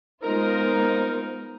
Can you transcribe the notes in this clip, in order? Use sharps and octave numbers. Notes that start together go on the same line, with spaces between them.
G#3 B3 D#4 F4 A#4 C5